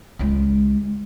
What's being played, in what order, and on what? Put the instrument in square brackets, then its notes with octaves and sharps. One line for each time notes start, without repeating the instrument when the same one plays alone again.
[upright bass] C#2 G#3